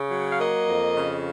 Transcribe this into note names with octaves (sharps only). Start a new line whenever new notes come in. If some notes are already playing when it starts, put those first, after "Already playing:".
Already playing: C#3
F#3
F5
A#3 D#5
F2
C#3